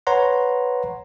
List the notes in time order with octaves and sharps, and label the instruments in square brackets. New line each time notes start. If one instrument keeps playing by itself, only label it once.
[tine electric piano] B4 C#5 F#5 A#5 C6